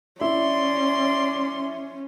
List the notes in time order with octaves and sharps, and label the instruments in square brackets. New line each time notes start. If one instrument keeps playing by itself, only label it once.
[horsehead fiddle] C#4 [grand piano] E4 [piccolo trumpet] D5 [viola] C6